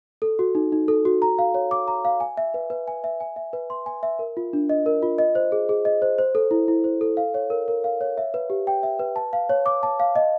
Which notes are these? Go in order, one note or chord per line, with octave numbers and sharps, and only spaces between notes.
A4
F#4
D#4
D#4
A4
F#4
A#5
F5
C#5
D6
A#5
F5
G#5
E5
B4
B4
G#5
E5
G#5
E5
B4
C6
G#5
E5
A#4
F4
D4
D#5
A#4
F4
D#5
C5
G#4
G#4
D#5
C5
C5
A4
E4
E4
C5
A4
F5
C#5
A#4
A#4
F5
C#5
E5
B4
G4
G5
E5
B4
A5
F5
C#5
D6
A5
F5
D#5